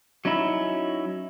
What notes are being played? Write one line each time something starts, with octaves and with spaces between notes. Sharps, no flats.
F#3 C#4 D#4 E4